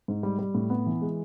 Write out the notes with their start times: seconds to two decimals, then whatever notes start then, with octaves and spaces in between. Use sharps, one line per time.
0.08 G#2
0.23 G3
0.39 G3
0.55 A2
0.70 B3
0.86 E3
1.02 G#3